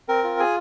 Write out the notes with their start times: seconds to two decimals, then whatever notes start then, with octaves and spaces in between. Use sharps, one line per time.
0.08 C4 A#4
0.24 F4
0.39 G#4 G#5